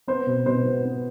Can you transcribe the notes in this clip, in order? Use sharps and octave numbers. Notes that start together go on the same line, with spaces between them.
B3 C5
B2
B2 C5
B3
B3